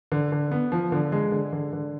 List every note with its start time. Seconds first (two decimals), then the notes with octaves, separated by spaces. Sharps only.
0.12 D3
0.32 D3
0.51 B3
0.72 F3
0.92 D3
1.12 G#3
1.32 D3
1.53 D3
1.73 D3